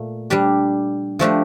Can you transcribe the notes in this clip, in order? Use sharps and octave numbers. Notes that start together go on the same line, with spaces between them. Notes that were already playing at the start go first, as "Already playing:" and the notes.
Already playing: A#2 A3
G3 D4 G4
F3 A3 D4 G4